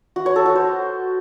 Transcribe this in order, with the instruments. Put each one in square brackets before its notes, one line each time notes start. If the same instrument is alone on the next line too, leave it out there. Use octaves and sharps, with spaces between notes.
[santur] F#4
C#5
A4
F#4
C5